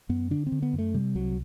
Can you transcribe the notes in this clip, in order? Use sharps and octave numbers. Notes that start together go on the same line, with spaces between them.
F#2 B3
D3 D4
C4
D3
B3
F#2
A3
C3 G3
C2 F#3